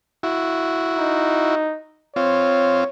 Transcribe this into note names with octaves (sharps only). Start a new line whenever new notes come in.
E4 F#4
D#4
C4 F4 C#5